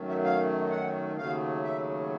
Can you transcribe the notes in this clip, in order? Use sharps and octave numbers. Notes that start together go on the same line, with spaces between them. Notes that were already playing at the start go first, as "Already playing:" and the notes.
Already playing: F#2 D#3 F#3 A3
E5
F5
F#5
D#2 C#3 F#3 A3 F5
E5